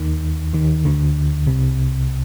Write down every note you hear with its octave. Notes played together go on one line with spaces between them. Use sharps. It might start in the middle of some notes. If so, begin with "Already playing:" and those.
Already playing: D#2 D#3
D#2 D#3
D2 D3
C2 C3